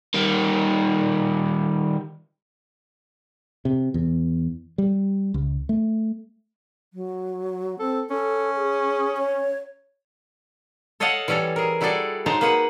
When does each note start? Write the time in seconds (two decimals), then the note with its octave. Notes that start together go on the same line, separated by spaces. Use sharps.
0.14 D#3 G3
3.65 C3
3.94 E2
4.78 G3
5.34 C#2
5.69 A3
6.94 F#3
7.79 C4 A4
8.10 C#4 A4
8.57 G#4
9.18 C#5
11.00 A4 C#5 D#5 F5 F#5 A5
11.28 E3 G3 C#4 A4 C#5
11.56 G#4 A#4
11.81 G3 E4 F#4 G#4 A4 D5
12.26 F#3 G#3 D#4 C5 A5 A#5
12.41 A#3 G#4 B4 F#5